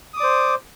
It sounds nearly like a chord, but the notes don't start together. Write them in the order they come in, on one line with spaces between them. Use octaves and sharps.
D#6 D6 D5 C5